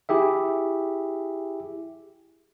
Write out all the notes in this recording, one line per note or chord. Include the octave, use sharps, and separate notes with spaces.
E4 G4 G#4 E5